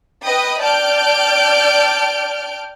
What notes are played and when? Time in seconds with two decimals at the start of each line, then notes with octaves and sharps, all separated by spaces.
0.24 B4 D#5 G5 B5 D#6
0.60 D5 G5 A5 F6 G6 D7